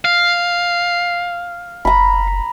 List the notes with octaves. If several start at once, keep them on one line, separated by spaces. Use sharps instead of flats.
F5
F#1 A#5 B5